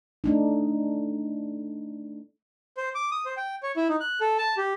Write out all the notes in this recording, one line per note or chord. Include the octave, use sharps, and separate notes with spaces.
A3 D4 D#4
C5
D6
D#6
C5
G5
C#5
E4
D#4
F#6
A4
A5
G4